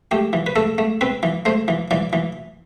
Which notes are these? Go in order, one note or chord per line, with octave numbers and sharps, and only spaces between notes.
A3 G4
E3
B4
A3 A4
A3
C4 B4
E3
A3 C5
E3
E3 D5
E3